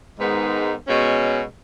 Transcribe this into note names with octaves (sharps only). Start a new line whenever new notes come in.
G#2 D#3 G#3 B3 D#4
B2 G#3 C#4